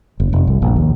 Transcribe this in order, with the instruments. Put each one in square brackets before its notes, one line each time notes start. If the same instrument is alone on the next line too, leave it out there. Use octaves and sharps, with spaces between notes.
[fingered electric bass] F#1
F1
C2
A#1
D#2